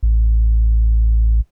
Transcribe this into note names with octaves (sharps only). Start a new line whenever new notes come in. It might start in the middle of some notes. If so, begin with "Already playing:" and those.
A1